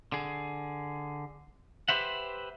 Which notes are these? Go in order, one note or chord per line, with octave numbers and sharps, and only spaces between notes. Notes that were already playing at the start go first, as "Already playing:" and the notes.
D3 G#4
G4 B4 C5 E5 F#5